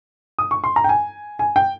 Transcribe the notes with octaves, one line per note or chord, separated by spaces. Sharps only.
D#6
C#6
C6
A#5
G5
G#5
G#5
G5